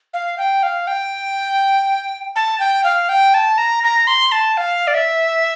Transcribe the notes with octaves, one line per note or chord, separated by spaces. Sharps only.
F5
G5
F5
G5
A5
G5
F5
G5
A5
A#5
A#5
C6
A5
F5
D5
E5